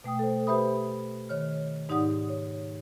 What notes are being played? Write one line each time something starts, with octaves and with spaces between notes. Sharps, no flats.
B2 A3 G5 D#6
A4 C5
G4 B4 C5 E5 B5 D#6
D#3 C#5 F6
G#2 D#4 G4 D5 F#5 D#6
C#5